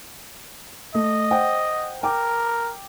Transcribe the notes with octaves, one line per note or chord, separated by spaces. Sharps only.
A3 D#5
C5 F#5 G5
A#4 G5 D6